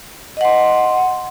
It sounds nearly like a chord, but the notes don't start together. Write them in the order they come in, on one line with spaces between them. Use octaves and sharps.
D#5 F#5 C6